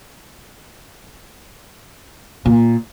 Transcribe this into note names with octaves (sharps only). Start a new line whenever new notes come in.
A#2